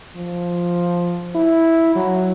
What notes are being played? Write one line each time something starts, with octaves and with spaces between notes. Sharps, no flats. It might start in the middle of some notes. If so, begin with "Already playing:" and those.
F3
E4
F#3